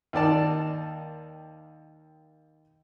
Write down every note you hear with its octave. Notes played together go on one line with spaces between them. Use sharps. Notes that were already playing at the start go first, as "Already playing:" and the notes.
D#2 D#3 D5 A5